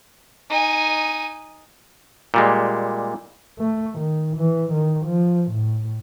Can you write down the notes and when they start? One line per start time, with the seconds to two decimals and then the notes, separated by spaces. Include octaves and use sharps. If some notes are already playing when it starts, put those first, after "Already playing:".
0.50 D#4 G#5
2.34 A#2 G3 G#3
3.59 A3
3.99 D#3
4.37 E3
4.73 D#3
5.06 F3
5.51 A2